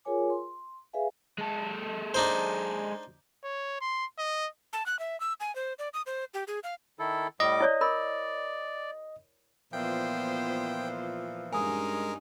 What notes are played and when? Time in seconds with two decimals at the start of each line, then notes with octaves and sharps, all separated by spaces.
0.05 F4 G#4 A#4 C#5 G#5 D6
0.30 C6
0.93 G#4 B4 D5 E5 F5 G#5
1.38 G#3 A4
2.14 D4 D#4 C5
3.45 C#5
3.81 C6
4.19 D#5
4.73 A5
4.86 F#6
4.99 E5
5.20 E6
5.40 G#5
5.56 C5
5.79 D5
5.94 D#6
6.06 C5
6.34 G4
6.47 G#4
6.64 F5
6.99 D#3 E4 A4
7.40 A2 G3 D#5 D6
7.60 E4 C#5 D5
7.81 A#4 D5 B5
9.73 A#2 E3 F3 B3 C5 G5
11.53 G2 G#3 C#4 D#4 A#4 G#5 D#6